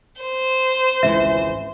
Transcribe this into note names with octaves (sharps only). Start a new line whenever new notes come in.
C5
G#1 C#2 E3 E5